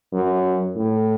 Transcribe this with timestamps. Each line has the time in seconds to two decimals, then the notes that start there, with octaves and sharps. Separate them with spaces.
0.13 F#2
0.76 A2